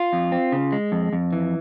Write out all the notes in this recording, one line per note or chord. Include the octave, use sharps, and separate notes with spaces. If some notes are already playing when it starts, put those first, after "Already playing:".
Already playing: F4
F2
C4
C#3
G#3
F2
F2
E3